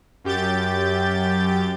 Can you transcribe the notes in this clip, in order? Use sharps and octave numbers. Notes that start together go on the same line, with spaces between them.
F#2 G4 G6 A6